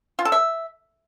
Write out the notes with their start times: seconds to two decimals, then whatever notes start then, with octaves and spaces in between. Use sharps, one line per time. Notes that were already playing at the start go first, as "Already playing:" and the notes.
0.19 F4
0.25 A4
0.32 E5